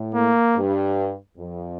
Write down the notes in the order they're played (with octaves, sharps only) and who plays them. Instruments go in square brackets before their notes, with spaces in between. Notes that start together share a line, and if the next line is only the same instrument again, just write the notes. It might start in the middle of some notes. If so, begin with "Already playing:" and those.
Already playing: [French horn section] A2
[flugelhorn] A#3
[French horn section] G2
F2